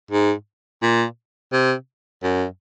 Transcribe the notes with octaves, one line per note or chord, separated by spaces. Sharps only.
G#2
A#2
C3
F#2